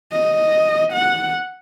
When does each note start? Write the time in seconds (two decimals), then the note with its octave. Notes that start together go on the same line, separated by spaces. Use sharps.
0.13 D#5
0.93 F#5